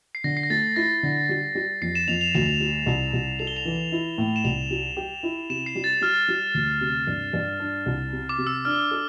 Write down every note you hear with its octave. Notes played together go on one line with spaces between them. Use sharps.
C7
D3 A#6
C7
A#6
A3 A6
E4 A#6
D3
G3
G3
F2 C7
E7
F2 F7
F7
D2 E7
G3
C2
C2
A4 F7
G7
F7
E3
E4
A2
E7
C2 F7
G3
G4
E4
C3 E7
C7
G3
A6
G3 F6
G3
D2
C3
G2
G2
D4
C2
C3
D6
C3
E6
D4 F6
A4